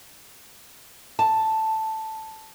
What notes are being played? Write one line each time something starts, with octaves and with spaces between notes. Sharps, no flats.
A5